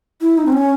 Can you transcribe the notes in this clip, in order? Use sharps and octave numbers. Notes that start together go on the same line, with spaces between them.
E4
D#4
C4
C#4